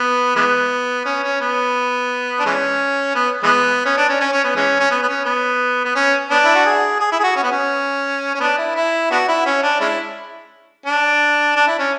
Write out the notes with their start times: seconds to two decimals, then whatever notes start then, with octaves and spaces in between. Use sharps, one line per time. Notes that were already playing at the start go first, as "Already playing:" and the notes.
Already playing: B3
0.36 E3 G#3 B3
1.05 C#4
1.23 C#4
1.40 B3
2.39 D4
2.46 E3 G#3 C#4
3.15 B3
3.43 E3 G#3 B3
3.86 C#4
3.97 D4
4.09 C#4
4.21 C#4
4.32 C#4
4.44 B3
4.56 E3 G#3 C#4
4.80 C#4
4.91 B3
5.03 B3
5.08 C#4
5.25 B3
5.85 B3
5.96 C#4
6.31 B3 D4
6.44 E4
6.55 F#4
6.66 G#4
7.00 G#4
7.12 E4
7.20 G#4
7.24 F#4
7.36 C#4
7.43 B3
7.52 C#4
8.35 C#4
8.40 B3 D4
8.58 E4
8.75 E4
9.11 B3 D4 F#4
9.28 E4
9.46 C#4
9.63 D4
9.80 G#3 C#4 E4
10.86 D4
11.56 D4
11.67 E4
11.79 C#4